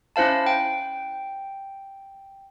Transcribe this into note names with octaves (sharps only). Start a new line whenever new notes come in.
C#4 E4 C5 F5 A5
G5